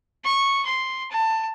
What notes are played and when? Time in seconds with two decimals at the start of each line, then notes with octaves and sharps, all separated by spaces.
0.24 C#6
0.66 C6
1.11 A5